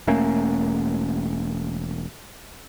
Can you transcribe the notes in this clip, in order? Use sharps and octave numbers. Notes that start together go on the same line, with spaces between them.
E1 A3 A#3 C#4